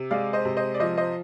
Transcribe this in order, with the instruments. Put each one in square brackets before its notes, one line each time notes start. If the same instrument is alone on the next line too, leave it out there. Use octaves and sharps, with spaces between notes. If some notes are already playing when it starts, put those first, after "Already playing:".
Already playing: [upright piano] C3
G#3 D5 F5
C5 D#5
C3
C5 D#5
D5
F3 C5 D#5
C5 D#5